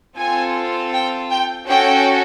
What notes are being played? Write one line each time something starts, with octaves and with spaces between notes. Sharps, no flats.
C4 F4 A4 G#5
G5
G5
C#4 F#4 A4 G5